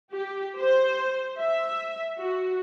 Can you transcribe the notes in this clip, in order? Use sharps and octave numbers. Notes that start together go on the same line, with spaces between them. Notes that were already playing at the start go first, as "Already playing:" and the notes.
G4
C5
E5
F#4